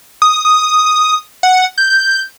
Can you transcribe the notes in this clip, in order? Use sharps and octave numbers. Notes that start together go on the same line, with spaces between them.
D#6
D#6
F#5
G6